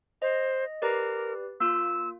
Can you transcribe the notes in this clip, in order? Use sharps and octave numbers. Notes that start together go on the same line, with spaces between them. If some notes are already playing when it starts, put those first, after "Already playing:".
C5 D#5
G4 A#4 B4 D5
A#3 F4 E6